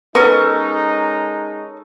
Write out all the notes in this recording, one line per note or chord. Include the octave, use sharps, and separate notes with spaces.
G#3 B3 C#4 D#4 A4 A#4 D#5 C#6